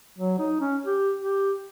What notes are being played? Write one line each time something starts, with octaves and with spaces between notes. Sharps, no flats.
F#3
D#4
C#4
G4
G4